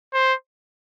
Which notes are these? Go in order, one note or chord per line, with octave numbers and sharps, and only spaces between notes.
C5